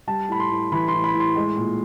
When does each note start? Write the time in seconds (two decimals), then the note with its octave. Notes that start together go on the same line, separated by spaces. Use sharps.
0.07 G3 A5
0.28 A2 B5
0.40 C6
0.51 A2
0.72 E3 B5
0.88 C6
0.94 A2
1.04 B5
1.14 A2
1.20 C6
1.36 G#3
1.57 A#2